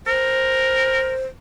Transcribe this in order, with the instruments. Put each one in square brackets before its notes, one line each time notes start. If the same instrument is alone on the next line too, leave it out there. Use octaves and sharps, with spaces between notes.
[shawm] A#4 [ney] C5